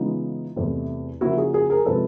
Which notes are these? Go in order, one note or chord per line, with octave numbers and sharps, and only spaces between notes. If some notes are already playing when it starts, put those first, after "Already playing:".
Already playing: C#3 E3 G#3 B3 D#4 F4
E2 C3 E3 A3
C#3 F3 A#3 E4 F#4
F#4 G#4
F#4 G#4
G#4 A#4
C3 F3 G#3 A4 B4